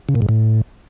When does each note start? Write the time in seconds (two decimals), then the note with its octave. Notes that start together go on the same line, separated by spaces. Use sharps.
0.09 C#3
0.15 A#2
0.22 G#2
0.29 A2